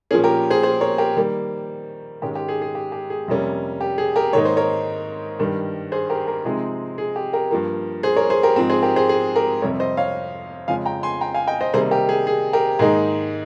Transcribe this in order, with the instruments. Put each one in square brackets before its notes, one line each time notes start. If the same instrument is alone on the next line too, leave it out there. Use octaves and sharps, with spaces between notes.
[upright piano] A#2 F3 A#3 C#4 G#4
G4 A#4
G#4 C5
G#4 C5
A#4 C#5
G4 A#4
D#3 G3 A#3
G#2 D#3 G#3 C#4 G4
G4
G#4
G#4
G4
G4
G#4
F2 C3 G3 A#3 C#4
G4
G#4
G4 A#4
G#2 D#3 A#3 D#4 C#5
C5
A#4 C#5
G2 D#3 G3
G#4 C5
G4 A#4
G4 A#4
C3 F3 G#3 C4 D#4 G#4
G#4
G4
G4 A#4
G2 F3 A#3
G#4 C5
A#4 C#5
G#4 C5
G4 A#4
G#2 F3 C4
G#4 C5
G4 A#4
G#4 C5
G#4
G4 A#4
F2 C3 G3 A#4 C#5
C5 D#5
C#5 F5
F2 C#3 F3 G#3 C#4 F5 G#5
G5 A#5
G#5 C6
G5 A#5
F5 G#5
D#5 G5
C5 D#5
C3 D#3 G3 A#3 D#4 G#4 C5
G4 A#4
G#4
G#4
G4 A#4
G#2 D#3 A#3 D#4 G#4